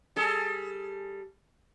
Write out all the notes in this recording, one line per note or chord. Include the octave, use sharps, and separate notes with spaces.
G3 G#4 A4